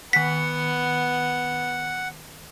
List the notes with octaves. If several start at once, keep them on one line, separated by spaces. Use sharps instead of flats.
D#3 B3 F#5 B6 C#7